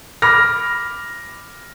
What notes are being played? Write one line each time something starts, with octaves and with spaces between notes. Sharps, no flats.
B5 D6 F6 A#6